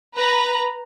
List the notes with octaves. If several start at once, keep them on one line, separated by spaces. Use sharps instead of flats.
B4 A#5